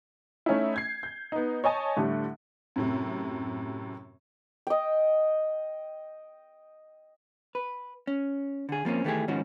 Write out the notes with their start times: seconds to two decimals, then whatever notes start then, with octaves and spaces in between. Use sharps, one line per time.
0.46 A3 C#4 D#4 E4
0.74 G6 G#6 C7
1.03 G6
1.32 B3 D#4
1.64 C#5 D#5 G#5 A5
1.97 A2 D3 G3 A3
2.76 F#2 A2 C3
4.67 D#5 G5
7.55 B4
8.07 C#4
8.69 D3 G#4
8.85 F3 A#3 C4 C#4
9.04 D#3 E3 A3 C#4 G4 G#4
9.28 G#2 D#3 F3 C#4 F#4